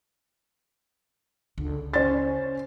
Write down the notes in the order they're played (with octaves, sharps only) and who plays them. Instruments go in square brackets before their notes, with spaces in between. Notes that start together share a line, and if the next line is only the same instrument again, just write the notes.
[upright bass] C#2 [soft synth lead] D3
[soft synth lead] C#4 [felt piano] C5 A6